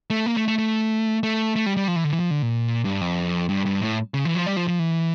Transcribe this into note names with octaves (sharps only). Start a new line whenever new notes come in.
A3
A#3
A3
A3
A3
A3
A3
G3
G3
F3
E3
D3
E3
F3
D3
A#2
G2
F2
G2
G2
A2
C#3
E3
F3
G3
F3
F3
E3